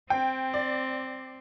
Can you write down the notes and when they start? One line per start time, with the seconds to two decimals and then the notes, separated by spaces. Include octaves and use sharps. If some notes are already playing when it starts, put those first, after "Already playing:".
0.10 C4 G5
0.54 D5